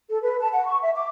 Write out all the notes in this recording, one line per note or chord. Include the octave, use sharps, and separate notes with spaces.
A4
B4
A5
F#5
C#6
E5
D6